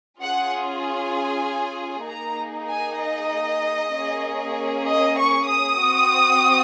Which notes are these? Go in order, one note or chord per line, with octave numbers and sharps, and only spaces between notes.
C#4 F4 G#4 F#5
G#5
A#3 D#4 G#4 A#5
G#5
D#5
A#3 C#4 G#4
D#5
C#6
D#6
C4 F#4